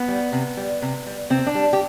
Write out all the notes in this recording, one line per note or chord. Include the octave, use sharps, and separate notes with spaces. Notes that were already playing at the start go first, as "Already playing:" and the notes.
Already playing: B3
G3
C3
G3
C3
G3
C3 C4
D4
G3
G4